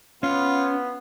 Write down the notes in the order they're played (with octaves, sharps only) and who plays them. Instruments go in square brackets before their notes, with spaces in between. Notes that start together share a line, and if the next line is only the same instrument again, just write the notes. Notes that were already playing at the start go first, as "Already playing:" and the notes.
[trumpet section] B3 [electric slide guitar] C#4 [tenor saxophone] F4